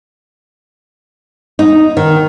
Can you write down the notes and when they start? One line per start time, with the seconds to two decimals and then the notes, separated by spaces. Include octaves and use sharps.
1.59 D#4
1.97 D#3